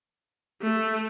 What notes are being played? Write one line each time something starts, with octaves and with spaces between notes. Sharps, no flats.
A3